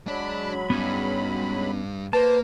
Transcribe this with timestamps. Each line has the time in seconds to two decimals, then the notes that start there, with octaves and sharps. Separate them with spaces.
0.07 F#3 G#3 D4 D5 B5
0.70 G2 B3 C#4 D#4
2.13 A#3 B4 C5 A5